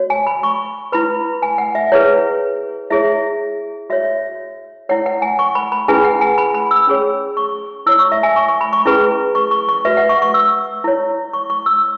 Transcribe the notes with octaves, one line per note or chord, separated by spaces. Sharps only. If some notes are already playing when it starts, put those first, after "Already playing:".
Already playing: F#4 C#5
G#5
B5
C#6
E4 B4 B5
G#5
F#5
E5
E4 G#4 B4 C#5
E4 G#4 C#5 E5
F#4 C#5 E5
E4 C#5 F#5
F#5
G#5
C#6
B5
B5
C#4 E4 G#4 B4 G#5
F#5
G#5
B5
B5
E6
C#4 G#4 C#5
C#6
E4 C#5 E6
C#6
E5
G#5
C#6
C#6
B5
C#6
C#4 E4 G#4 B4
C#6
C#6
C#6
F#4 B4 E5
F#5
C#6
C#6
E6
E4 C#5
C#6
C#6
E6